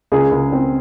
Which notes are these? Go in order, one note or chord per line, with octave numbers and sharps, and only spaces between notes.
C#2 G#4
C#2
C4